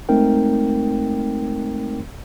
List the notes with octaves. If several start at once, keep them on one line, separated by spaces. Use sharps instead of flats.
G#3 A3 C4 D#4 A#4 G5